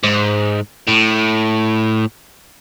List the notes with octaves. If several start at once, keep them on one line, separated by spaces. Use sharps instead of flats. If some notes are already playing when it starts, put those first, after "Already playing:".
G#2
A2